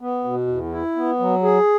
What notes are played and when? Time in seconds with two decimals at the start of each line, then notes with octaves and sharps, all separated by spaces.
0.01 B3
0.24 B2
0.47 E2
0.72 E4
0.96 B3
1.19 F#3
1.43 G#4